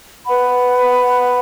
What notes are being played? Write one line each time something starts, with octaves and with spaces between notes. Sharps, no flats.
B4 F#5 B5